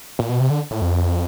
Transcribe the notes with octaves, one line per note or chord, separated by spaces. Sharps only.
A#2
B2
C3
D3
A2
F2